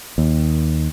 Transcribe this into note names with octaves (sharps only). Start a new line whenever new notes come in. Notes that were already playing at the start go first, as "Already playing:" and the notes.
D#2